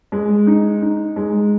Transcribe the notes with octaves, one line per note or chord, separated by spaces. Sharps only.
G#3
D#4
D#4
G#3